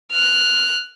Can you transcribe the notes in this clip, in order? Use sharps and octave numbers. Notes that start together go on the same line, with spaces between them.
F6 F#6